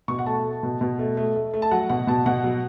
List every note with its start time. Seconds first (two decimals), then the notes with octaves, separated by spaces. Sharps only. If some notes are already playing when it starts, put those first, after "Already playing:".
0.08 B2 C#6
0.19 F#5
0.26 A3 A5
0.44 A3
0.63 B2
0.81 B2
0.99 A3
1.17 A3
1.36 A3
1.54 A3
1.62 A5
1.71 F#3 F#5
1.89 B2 F#5
2.07 B2 A5
2.26 B2 F#5
2.44 F#3